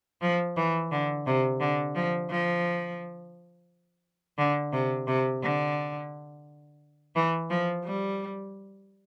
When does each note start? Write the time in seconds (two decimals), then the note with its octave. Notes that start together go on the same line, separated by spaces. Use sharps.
0.22 F3
0.56 E3
0.91 D3
1.26 C3
1.60 D3
1.96 F3
2.30 F3
4.38 D3
4.73 C3
5.07 C3
5.43 D3
7.15 E3
7.50 F3
7.84 G3